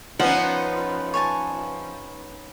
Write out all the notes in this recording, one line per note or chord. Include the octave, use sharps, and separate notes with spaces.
F3 B3 C#4 D#4 F#5
C#5 G#5 A5